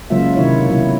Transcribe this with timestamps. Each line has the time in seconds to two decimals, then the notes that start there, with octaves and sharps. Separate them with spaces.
0.10 C#3 F#3 G#3 A#3 F4 E5
0.36 C3 D#3 E4 C#5
0.69 B2 F#3 E4